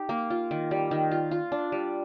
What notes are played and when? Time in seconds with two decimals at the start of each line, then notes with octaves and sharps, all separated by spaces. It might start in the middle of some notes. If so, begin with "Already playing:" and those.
Already playing: D#4 G4
0.09 A#3
0.30 F4
0.51 D#3
0.71 G3
0.91 D#3
1.11 F4
1.31 F4
1.52 D4
1.72 G3